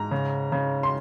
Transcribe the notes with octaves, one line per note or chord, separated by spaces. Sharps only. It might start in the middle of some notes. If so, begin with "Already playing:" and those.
Already playing: G#2 A#5
C#3
C#3
C6